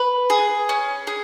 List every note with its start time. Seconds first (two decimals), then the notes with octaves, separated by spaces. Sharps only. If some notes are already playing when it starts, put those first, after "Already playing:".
Already playing: B4
0.30 G#4
0.69 C#4
1.07 G#4